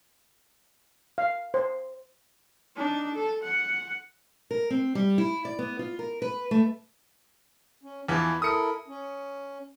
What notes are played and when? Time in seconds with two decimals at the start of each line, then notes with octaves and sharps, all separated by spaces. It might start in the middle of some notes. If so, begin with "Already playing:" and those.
1.18 F5
1.54 C5
2.76 D4 D#4
3.15 A4
3.44 F#5
4.51 A#4
4.70 C4
4.95 G3
5.18 E4
5.45 D5
5.59 B3
5.79 F4
5.99 A#4
6.22 B4
6.51 A3
7.83 C#4
8.08 E2 E3 F3 E4
8.42 E4 A4 A#4 D#6 C#7
8.88 C#4